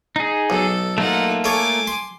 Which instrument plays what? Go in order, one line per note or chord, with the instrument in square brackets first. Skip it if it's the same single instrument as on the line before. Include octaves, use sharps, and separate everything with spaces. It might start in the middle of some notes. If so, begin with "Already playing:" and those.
[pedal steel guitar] D#4 G#4
[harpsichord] B1 [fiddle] A4
[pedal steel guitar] A3 A#3 F4 [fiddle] D#4 F#5
[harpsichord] A4 C#5 [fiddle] G#5 D6
[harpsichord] C6